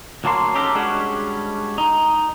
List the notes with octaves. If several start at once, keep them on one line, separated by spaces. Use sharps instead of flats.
D2 F#3 A#3 A5 C6
C#4 D#4 G4 A4 A#4
G3 G#3 C#4 D4 F#4
D#4